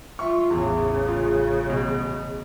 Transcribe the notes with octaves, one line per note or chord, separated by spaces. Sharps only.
F4 E5 C#6
A1 E2 C#3
F4
B2